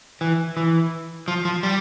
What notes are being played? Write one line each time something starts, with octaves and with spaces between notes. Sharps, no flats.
E3
E3
F3
F3
G3